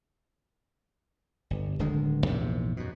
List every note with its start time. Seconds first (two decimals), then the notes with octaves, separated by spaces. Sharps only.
1.50 G1
1.79 D1 D3 D#3 G#3
2.27 A#1 E2 G#2 C3
2.77 F#2 B2